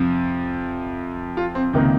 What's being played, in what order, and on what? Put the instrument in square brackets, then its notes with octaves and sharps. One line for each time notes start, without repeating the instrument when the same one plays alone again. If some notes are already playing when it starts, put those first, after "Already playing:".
Already playing: [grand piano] F2 C3 F3
F4
C4
C#2 C3 D#3 A#3